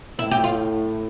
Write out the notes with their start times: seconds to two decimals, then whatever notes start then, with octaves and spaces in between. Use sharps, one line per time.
0.19 A2 E4
0.31 G4
0.44 F4